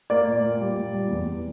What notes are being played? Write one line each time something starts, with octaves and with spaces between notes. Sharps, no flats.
A#3 D5
A#2
A#2
G3
A#2
G3
E2